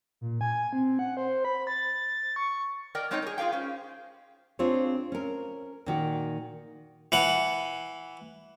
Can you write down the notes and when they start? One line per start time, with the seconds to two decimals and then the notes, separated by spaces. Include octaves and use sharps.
0.21 A#2
0.41 G#5
0.73 C4
0.99 F#5
1.17 C5
1.45 B5
1.67 A6
2.36 C#6
2.95 A#4 D5 D#5 G5
3.11 G#3 C4 D#4 C#5 D#5 G5
3.22 G#4 A#4
3.38 F4 G#4 A#4 F5 G5
3.52 C#4 C5
4.59 C4 D4 F4 G#4 C#5
5.12 C#4 A#4
5.86 A#2 D#3 F#4
7.12 E3 F#5